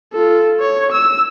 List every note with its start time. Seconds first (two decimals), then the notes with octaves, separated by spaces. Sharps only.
0.13 F4 A4
0.60 C#5
0.91 E6